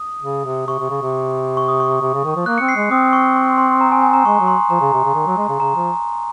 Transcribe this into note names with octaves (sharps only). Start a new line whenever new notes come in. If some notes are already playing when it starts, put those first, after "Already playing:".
Already playing: D#6
C#3
C3
C3 C#6
C3
C#3
C3
C#6
D#6
C#6
C3
C#3
D#3
F3
A#3 F#6
C#7
C4
C7
G#3
C4 D#6
C#6
C6
C6
A#5
G#5
G#5
A#5
G#3 C#6
F#3
C6
F3 A#5
C#3
C3 A#5
C#3
D#3
F#3
G#3
C#3
C#3 A#5
F3